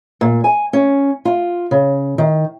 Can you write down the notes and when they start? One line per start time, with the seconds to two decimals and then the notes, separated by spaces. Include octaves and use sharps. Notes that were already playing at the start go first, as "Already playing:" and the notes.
0.21 A#2
0.44 G#5
0.73 C#4
1.25 F4
1.71 C#3
2.18 D#3